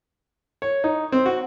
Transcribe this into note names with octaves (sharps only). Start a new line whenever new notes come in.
C#5
D#4
C4
F#4